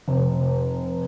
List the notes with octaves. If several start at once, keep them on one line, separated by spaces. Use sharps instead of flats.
F1